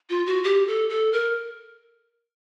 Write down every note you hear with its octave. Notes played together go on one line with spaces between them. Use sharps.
F4
F#4
G4
A4
A4
A#4